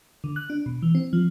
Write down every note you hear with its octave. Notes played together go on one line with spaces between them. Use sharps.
D3
F#6
D4
B2
E3
C4
F3